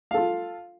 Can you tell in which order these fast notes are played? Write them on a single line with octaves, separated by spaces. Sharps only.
F5 A4 F4